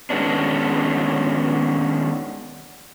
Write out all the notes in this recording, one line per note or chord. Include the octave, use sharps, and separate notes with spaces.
D#3 G#3 B3 C#4 D4